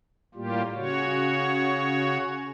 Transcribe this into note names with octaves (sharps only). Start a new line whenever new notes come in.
A2 G3 A#3 F4 G4
C#3 F#4 C#5